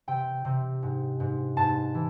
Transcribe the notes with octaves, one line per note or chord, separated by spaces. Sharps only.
C3 G5
C3
G#2
G#2
G#2 A5
E3